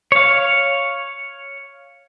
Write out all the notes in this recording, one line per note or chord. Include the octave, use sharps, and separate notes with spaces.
C#5 F5